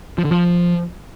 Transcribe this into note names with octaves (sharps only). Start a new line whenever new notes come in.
F3
D3
F3